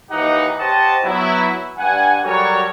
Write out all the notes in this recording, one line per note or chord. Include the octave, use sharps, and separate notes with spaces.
D#2 E3 D#4 G4 F#5
G4 C5 C#5 D#5 F#5 A5
F#3 B3 E4
G2 F#5 G#5
F#3 G3 F#4 A4 A#4 C#5